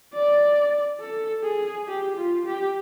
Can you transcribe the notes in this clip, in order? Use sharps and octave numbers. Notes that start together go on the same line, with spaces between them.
D5
A4
G#4
G4
F4
G4